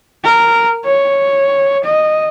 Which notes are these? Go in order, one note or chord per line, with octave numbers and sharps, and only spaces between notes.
A#4
C#5
D#5